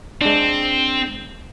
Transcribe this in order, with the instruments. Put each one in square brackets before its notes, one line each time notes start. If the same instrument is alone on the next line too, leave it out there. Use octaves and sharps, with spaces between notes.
[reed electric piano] G#3 D4 [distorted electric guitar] C4